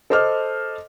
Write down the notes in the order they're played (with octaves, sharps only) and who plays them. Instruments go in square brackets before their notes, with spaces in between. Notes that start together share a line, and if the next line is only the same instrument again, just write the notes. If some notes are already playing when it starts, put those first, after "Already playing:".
[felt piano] A4 C5 D#5 D6 F6